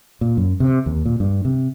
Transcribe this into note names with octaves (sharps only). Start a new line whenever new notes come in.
A#2
F#2
C3
D#2
A#2
G2
C3